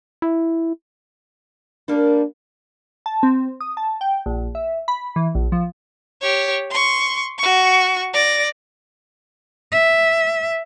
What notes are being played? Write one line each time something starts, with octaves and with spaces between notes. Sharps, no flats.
E4
G3 A#3 D4 A#4
A5
C4
D#6
A5
G5
A#1
E5
B5
E3
A#1
F3
G4 C#5
C6 C#6
F#4 C#6
D5 A#6
E5